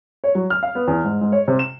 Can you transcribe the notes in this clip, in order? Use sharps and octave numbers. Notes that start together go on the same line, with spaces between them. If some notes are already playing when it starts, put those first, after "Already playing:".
C#5
F#3
F6
F5
B3
E2
G#2
G#2
C#5
C3
E7